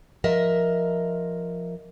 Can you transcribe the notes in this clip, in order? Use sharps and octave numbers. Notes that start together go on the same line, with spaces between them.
F3 A#4 D#5 E5